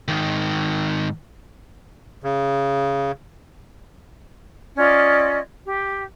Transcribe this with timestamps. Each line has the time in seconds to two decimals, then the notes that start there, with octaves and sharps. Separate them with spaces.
0.08 G#2 D#3
2.24 C#3
4.78 C#4 F4 D5 D#5
5.66 G4